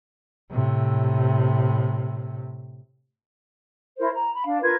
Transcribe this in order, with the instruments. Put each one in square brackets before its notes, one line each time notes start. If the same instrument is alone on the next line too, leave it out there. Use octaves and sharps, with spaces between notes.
[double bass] A2 C3
[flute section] E4 A#4 C5
A#5
B5
D4 F5
F4 A#4 B4 G#6